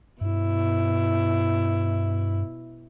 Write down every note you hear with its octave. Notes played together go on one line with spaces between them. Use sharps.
G2 B2 E4